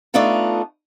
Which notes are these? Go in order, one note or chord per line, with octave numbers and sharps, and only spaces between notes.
A3 B3 D4 D#4 F4 A4